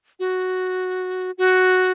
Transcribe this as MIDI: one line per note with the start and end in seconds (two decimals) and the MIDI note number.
0.20 1.31 66
1.38 1.92 66